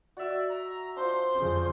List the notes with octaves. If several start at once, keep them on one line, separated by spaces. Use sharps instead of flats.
F#4 D5 E5
A#5
D4 F4 C5 C6
F2 C#3